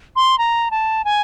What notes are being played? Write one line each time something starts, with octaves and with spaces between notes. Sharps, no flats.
C6
A#5
A5
G#5